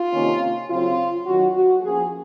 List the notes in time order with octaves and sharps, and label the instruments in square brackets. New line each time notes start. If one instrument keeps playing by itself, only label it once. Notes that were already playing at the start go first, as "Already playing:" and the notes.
Already playing: [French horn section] F4
C3 D#3 A#3 C#4
C#3 F#3 C4 F4
D#3 F#3 C#4 F#4
F#4
F3 A#3 C#4 G#4